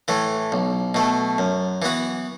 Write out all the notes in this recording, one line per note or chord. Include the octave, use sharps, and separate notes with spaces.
A2 E3 A3
B1
B2 A3
F#2
E3 B3 F#4